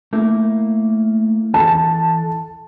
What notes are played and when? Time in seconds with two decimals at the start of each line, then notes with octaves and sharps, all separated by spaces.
0.13 A3 A#3 E4
1.54 E3 A4 A5